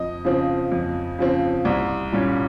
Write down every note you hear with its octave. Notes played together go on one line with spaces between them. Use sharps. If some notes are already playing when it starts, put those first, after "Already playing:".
Already playing: F2 D#5
C#3 F3 C4
F2
C#3 F3 C4
C2
A#2 G3 C#4